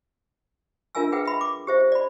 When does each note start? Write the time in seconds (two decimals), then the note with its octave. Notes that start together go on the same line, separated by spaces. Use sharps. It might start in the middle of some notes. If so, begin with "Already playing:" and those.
0.95 D4 F4 A#4 E5 G#5 E6
1.12 G#4 B4 E5 F#5 G5
1.26 E5 B5
1.41 D6
1.67 G4 C5 E5
1.92 D5 B5